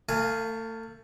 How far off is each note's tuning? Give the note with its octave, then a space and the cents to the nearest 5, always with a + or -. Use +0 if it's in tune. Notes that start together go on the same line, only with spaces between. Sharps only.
A3 +35 F4 +0 G#5 +0